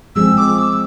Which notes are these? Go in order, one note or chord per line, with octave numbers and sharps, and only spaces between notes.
F3 G#3 C4 G#4 E6
D6
E6